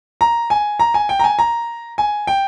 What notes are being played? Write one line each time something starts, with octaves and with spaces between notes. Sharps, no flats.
A#5
G#5
A#5
G#5
G5
A#5
G#5
A#5
G#5
G5